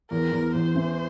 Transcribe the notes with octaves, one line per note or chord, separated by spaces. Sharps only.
E2 A#4
E2
E2 C5
E3